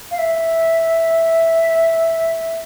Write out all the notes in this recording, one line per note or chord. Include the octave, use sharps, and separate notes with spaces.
F5
E5